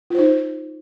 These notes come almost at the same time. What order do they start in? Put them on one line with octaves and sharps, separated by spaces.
F4 C5 D#4